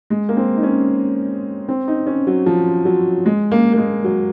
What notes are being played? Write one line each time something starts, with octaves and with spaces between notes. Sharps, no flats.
G#3
A#3
C4
D#4
C#4
C4
D#4
C#4
F#3
F3
F#3
G#3
A#3
A#3
G#3
F#3